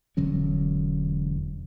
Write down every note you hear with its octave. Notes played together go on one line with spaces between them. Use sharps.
E1 D3 F#3 C#4